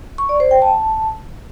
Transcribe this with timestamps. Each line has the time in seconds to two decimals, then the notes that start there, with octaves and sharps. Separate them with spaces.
0.18 C#6
0.29 D5
0.40 C5
0.51 G5
0.62 A5